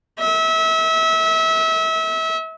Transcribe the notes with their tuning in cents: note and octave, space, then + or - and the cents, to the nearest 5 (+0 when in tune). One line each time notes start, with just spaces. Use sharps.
E5 -30